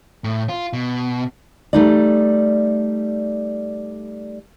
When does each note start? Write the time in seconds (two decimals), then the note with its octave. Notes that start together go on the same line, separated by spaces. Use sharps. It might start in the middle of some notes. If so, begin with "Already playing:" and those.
0.24 A2
0.49 F4
0.73 B2
1.73 G3 A3 D#4 D5